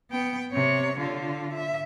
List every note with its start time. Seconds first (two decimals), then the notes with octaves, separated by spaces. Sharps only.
0.11 B3 G5
0.53 C3 C#5
0.99 D3 F4
1.53 E5